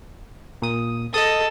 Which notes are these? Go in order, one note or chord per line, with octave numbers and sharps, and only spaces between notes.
A#2 D#6
A4 D#5 D#6